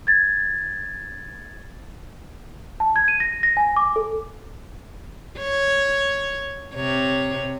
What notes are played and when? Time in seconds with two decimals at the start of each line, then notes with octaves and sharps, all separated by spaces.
0.07 G#6 A6
2.80 A5
2.96 G#6
3.08 D#7
3.20 A#6
3.43 A#6
3.57 G#5
3.76 D6
3.96 A4
5.38 C#5
6.74 C3 C#5